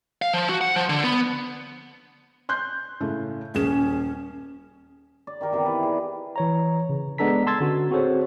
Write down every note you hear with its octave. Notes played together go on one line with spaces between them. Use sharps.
F5
F3
F#4
F#5
F3
D3
B3
C6 F#6 G6
A2 C#3 A3
D#1 C#4 G#4 E7
D5
D#3 G4 A#4 D5
C3 D#3 E3 B3
B4 D5
G#4 D6
E3 C#5 A#5
C#3
G#3 B3 D4 A4 A#5 B6
A5 C6 E6 G#6 A6
D3 C#4 F#4 A4
C4 F#4 G#4 A4 C5 C#5